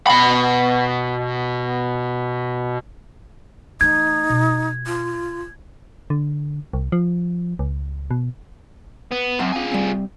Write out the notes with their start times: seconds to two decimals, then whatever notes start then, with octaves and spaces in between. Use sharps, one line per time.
0.07 B2 B5
3.81 E3 A3 D#4 G#6
4.29 B2
4.86 F4
6.10 D3
6.73 C2
6.92 F3
7.59 C#2
8.11 B2
9.11 B3
9.39 F#2 C4 F#5 C6
9.52 F4 G#4
9.72 G3 C4